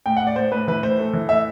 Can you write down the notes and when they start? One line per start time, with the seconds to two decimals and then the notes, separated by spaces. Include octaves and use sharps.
0.06 A2 G5
0.17 F#5
0.20 A2
0.27 D5
0.36 A2 C5
0.52 A2 B4
0.68 E3 B4
0.83 A2 C5
0.99 A3
1.14 E3
1.29 A2 E5